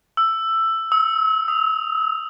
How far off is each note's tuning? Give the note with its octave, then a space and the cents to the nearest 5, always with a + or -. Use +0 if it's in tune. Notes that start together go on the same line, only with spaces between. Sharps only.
E6 +10
E6 -35
D#6 +10